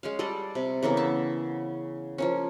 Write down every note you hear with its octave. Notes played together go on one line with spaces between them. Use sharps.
G#3 C#4 F5
G3 A4 D5 D#5
C3
C#3 E3 A#3 B3
E5 A5
F3 A#3 C#4